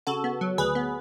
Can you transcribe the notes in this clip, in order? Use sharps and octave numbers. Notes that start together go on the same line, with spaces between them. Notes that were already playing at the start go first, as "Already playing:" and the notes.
C#3 F#4 A4
B3
F#3
D2 G#4 B4
B3